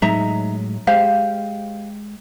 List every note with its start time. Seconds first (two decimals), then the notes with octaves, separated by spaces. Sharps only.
0.02 A2 F#3 G#3 D#4 E5 A#5
0.87 G#3 G4 C5 F5